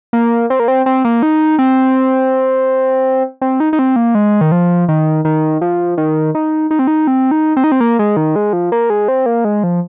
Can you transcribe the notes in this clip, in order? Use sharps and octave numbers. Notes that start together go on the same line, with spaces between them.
A#3
C4
A#3
C4
C4
A#3
D#4
C4
C4
D#4
D#4
C4
A#3
G#3
D#3
F3
D#3
D#3
F3
D#3
D#4
D#4
C4
D#4
C4
D#4
C4
D#4
C4
A#3
G#3
D#3
G#3
F3
A#3
G#3
C4
A#3
G#3
F3